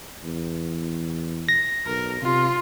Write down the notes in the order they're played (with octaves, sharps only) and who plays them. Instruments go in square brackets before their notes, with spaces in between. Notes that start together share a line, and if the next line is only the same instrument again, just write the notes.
[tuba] E2
[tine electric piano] A#6
[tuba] B1 [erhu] A#4
[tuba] C3 [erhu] F4